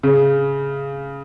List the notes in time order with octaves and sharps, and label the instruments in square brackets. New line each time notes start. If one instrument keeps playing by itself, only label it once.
[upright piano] C#3